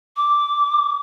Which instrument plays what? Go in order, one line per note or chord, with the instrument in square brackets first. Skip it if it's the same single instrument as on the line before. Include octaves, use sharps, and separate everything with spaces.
[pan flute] D6